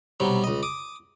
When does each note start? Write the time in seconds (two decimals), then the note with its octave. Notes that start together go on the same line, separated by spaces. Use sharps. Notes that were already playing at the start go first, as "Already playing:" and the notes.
0.20 B1 C3 F#3 G3
0.44 C#2 D#5
0.63 D6 D#6